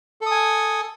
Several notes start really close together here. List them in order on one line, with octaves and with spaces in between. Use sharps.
A4 D#6 G#5